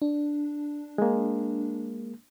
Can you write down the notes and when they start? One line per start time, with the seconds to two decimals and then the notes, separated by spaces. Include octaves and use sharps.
0.02 D4
0.98 G#3 A#3